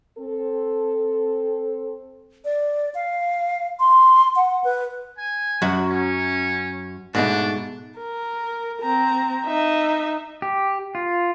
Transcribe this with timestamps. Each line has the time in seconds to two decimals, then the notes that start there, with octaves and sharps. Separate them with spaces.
0.19 C4 A4
2.45 D5
2.94 F5
3.79 C6
4.36 F#5
4.64 B4
5.18 G#5
5.62 F#2 F#3 F#4
5.90 C#4
7.15 G#2 B2 A3 D4
7.99 A#4
8.81 C4 A#5
9.46 D#4 E5
10.42 G4
10.95 F4